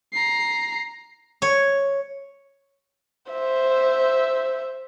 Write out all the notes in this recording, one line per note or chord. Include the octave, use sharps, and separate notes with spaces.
A#5 C7
C#5
C5 E5